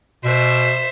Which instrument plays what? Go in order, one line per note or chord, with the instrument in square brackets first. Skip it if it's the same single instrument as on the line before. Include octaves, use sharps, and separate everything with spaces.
[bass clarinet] B2 [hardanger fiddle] C5 E5